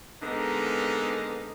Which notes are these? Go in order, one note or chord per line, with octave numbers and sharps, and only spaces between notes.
D3 G#3 A#3 B3 D#4